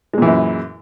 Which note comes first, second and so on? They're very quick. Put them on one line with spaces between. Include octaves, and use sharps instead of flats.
G#3 A#2 E3 F#2